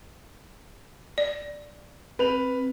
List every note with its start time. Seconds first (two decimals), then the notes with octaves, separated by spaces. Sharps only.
1.18 D5
2.19 C4 B4 F7